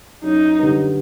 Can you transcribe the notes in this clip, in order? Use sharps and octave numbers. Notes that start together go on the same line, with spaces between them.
F#2 D#4
D3 G3 B3